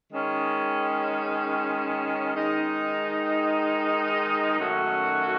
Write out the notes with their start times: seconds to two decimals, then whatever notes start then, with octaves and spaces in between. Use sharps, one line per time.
0.12 D#3 G#3 C#4
2.35 D#3 G#3 D#4
4.58 F#2 D#3 A3 C#4 F#4